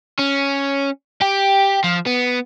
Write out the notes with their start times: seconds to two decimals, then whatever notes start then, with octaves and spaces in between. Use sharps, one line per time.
0.19 C#4
1.22 G4
1.84 F3
2.06 B3